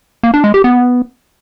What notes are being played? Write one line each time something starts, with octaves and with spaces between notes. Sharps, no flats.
A#3
D4
G#3
G4
B3